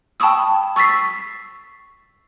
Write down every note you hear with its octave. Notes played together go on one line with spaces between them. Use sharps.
G5 A5 B5 C#6 D#6 E6
C#6 E6 A6 B6 C7
E6